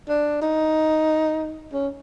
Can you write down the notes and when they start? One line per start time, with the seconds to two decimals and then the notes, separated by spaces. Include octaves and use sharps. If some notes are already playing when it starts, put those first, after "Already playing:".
0.09 D4
0.42 D#4
1.73 C#4